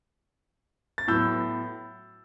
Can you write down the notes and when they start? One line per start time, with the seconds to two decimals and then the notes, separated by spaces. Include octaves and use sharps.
0.98 A6
1.08 A2 F#3 B3 E6 G6